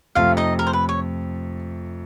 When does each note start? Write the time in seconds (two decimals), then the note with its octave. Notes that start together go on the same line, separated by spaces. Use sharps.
0.15 F2 C3 F3 A3 F4 F5
0.37 D#4 D#5
0.59 A#4
0.67 C5
0.73 B4
0.89 C#5